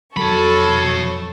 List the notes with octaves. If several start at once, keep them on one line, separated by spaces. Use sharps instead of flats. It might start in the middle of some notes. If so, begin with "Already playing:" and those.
F2 F#3 A4 C#5 A5 B5 C#6